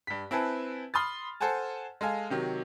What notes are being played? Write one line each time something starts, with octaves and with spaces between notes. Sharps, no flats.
G2 B6
C4 E4 B4 G#5 A5
B5 C6 D#6 F6 A6
A4 C5 F#5 G#5 A5
G#3 A4 F5 G#5
C3 D#3 F#3